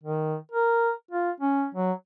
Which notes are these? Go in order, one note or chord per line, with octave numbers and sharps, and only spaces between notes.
D#3
A#4
F4
C#4
F#3